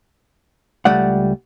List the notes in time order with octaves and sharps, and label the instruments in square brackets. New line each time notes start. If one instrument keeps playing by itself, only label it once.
[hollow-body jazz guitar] C#2 G3 A3 D5 F#5